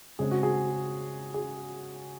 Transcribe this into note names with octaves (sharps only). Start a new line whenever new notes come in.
C#3 G#3 C4 G#4
F#4
G#4
G#4